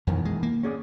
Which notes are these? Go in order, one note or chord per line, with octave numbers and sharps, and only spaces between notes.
F2 B2 D#3 E3
G#3
A#3
C#4 G#4 D5